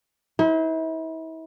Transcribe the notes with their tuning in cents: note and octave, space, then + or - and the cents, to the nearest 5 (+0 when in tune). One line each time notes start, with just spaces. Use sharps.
E4 -40 C5 -30